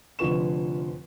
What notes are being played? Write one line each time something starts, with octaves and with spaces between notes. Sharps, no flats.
F1 D3 F3 B4 C#6 E7